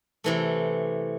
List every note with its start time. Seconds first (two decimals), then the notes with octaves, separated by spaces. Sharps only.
0.24 C3 E3 A3